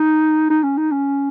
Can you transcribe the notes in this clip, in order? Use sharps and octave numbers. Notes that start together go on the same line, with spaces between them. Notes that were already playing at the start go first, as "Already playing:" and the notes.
Already playing: D#4
D#4
C#4
D#4
C#4